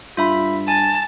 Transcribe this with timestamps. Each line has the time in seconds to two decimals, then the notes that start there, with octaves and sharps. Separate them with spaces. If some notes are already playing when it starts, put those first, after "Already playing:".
0.17 G2 F4 E5 B5
0.68 G#5 A5